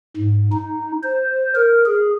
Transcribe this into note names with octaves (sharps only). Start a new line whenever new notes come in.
G#2
D#4
C5
A#4
G#4